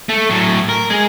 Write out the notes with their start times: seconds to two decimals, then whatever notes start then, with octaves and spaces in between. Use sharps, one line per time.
0.09 A3
0.30 A2 F#3
0.69 A#4
0.90 G#3 G#4